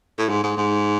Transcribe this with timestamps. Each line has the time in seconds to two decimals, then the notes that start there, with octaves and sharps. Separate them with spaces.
0.18 A2
0.29 G#2
0.44 G#2
0.57 G#2